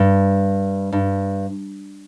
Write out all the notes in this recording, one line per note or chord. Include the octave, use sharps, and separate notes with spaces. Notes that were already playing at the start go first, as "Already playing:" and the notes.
Already playing: G2
G2